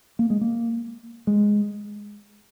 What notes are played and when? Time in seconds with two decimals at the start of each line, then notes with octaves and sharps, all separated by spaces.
0.19 A#3
0.30 G#3
0.41 A#3
1.27 G#3